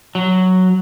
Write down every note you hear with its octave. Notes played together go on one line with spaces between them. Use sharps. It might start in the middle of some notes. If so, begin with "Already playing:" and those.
F#3